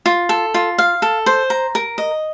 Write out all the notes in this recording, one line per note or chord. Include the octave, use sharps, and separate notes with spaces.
F4
A4
F4
F5
A4
C5
A#5
A#4
D#5